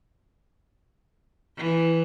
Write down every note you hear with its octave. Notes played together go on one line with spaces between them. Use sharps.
E3